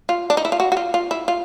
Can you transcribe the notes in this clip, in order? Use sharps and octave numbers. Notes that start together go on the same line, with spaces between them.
F4
D4
D#4
E4
F4
F#4
F#4
F4
F4
E4
F4